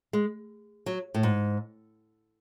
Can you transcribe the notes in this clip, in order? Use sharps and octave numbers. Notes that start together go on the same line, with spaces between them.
G#3
F#3
A2
G#2